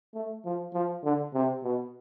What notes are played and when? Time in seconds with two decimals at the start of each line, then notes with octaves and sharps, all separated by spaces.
0.14 A3
0.45 F3
0.73 F3
1.03 D3
1.34 C3
1.63 B2